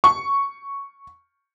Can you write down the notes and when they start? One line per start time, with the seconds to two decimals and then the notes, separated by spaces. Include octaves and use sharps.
0.04 C#6